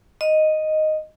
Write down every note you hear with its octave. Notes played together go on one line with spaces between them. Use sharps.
D#5